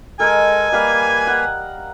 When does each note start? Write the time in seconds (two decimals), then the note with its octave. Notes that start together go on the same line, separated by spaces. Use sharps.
0.20 G#3 A4 A#4 D#5 G#5
0.72 G3 A#3 B4 F5
1.27 F#5